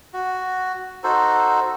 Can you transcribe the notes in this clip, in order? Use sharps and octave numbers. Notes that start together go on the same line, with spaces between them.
F#4
D#4 F#4 A4 C5